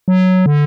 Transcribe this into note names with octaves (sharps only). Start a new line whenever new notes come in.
F#3
D3